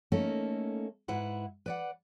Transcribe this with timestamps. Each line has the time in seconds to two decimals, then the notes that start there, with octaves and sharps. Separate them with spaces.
0.12 A3 A#3 C#4 D#4 A4
1.08 G#2 E4 B4 F#5
1.66 B4 D5 F#5